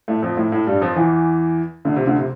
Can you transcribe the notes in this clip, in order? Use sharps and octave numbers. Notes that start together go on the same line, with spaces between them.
A2 A3
F2 F3
A2 A3
A2 A3
G2 G3
F2 F3
E2 E3
D2 D3
C3
D2 D3
C3